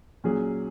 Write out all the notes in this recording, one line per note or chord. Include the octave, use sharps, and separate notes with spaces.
A#2 F#3 C#4 G#4